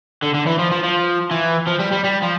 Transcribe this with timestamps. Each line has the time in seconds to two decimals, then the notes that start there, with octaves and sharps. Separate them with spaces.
0.23 D3
0.34 D3
0.47 E3
0.59 F3
0.71 F3
0.83 F3
1.31 E3
1.67 F3
1.80 G3
1.92 G3
2.04 G3
2.22 F3